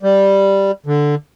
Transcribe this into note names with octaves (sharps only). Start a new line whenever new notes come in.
G3
D3